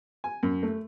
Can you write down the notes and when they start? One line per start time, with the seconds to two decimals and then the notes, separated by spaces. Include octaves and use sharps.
0.24 G#5
0.43 F#2
0.63 A3